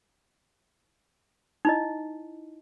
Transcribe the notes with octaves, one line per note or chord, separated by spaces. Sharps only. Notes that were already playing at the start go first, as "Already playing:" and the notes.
D#4 E4 D#5